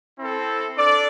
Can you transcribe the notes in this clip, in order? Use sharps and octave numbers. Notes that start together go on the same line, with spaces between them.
C4 E4 A4
D4 A4 D5